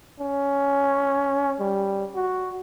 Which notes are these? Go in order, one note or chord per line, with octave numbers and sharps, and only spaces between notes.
C#4
G3
F#4